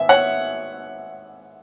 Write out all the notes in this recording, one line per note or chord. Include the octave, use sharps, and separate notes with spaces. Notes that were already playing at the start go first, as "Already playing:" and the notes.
Already playing: G#1 B3 E5
C#5 F#5